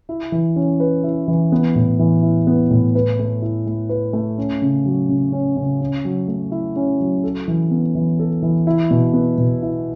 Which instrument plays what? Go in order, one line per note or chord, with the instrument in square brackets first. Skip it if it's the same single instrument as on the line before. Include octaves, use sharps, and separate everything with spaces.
[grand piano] E4
E3
C#4
B4
E4
E3
B3
A2
E3
E4
B3
A2
B4
A3
E4
A3
B4
A3
C#4
C#3
F#3
C#3
C#4
C#3
C#4
F#3
A3
E4
C#4
F#3
A4
E3
B3
E3
A4
E3
E4
B2
B3
B2
E4